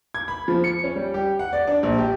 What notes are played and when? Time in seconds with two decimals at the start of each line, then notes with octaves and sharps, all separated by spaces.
0.15 G#6
0.28 B5
0.48 F3
0.64 C#7
0.84 C#4
0.96 G3
1.14 G4
1.39 F#5
1.53 D5
1.67 D4
1.83 A#1
1.98 G4